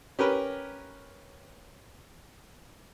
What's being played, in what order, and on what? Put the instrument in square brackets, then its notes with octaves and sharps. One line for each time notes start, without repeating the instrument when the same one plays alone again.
[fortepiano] C#4 G4 A#4 B4